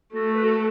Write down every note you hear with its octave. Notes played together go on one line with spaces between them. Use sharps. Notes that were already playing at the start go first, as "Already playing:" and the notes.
A3 F#4 A4
B4
F#4 A4